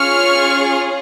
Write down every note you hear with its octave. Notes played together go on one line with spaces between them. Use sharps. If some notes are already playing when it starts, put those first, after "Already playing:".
Already playing: C#4 F4 G#4 C#6 F6